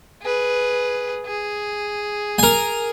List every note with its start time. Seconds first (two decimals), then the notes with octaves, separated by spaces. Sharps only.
0.22 G#4 B4
1.26 G#4
2.39 A#4 G#5